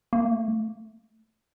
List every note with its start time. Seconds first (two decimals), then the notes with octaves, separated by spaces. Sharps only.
0.13 A#3
0.25 A3